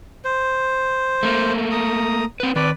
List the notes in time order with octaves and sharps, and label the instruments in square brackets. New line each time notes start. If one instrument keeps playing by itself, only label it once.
[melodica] C5
[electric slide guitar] A3 A#3
[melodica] A#5 D#6
[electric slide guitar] C4 B4
[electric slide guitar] D#3 C4 [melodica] B4 D5